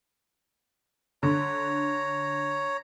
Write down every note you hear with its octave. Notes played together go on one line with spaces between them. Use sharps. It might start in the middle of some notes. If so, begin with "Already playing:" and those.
D3 C#5 A#5